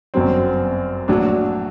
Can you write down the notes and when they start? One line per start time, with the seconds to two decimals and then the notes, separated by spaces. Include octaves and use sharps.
0.14 G1 F#2 F#3 C4
1.08 A#1 A2 F#3 D4